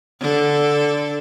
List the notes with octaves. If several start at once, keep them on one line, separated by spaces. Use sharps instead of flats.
D3 A4